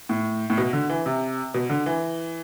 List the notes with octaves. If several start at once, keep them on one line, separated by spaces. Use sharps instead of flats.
A2
A2
B2
D3
E3
C3
B2
D3
E3